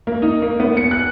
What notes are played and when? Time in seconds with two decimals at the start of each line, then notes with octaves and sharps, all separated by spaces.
0.07 A#3
0.22 D#4
0.42 A#3
0.60 B3
0.77 C#7
0.91 F#6